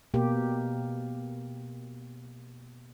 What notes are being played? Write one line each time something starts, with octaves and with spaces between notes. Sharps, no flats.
B2 A#3 G4